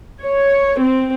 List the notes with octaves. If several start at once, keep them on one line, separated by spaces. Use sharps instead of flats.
C#5
C4